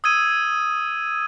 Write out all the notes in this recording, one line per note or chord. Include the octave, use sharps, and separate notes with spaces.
D#6 E6 G#6 D#7